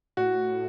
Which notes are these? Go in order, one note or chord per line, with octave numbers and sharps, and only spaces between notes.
A2 F#4